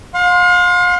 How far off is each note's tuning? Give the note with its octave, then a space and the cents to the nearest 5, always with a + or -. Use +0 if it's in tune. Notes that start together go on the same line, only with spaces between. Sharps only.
F5 +40 C6 +0